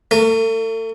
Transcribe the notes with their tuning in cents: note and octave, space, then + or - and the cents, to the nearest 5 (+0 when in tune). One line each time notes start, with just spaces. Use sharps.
A3 +35 A#4 -40